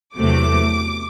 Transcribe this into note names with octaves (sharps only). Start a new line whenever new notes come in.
E2 C3 F#3 A3 D6